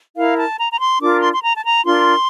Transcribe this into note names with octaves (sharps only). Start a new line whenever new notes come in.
E4 A#4 F5
A5
A#5
A#5
C6
D4 F4 A#4 D6
C6
C6
A#5
A5
A#5
D4 F4 A#4 C6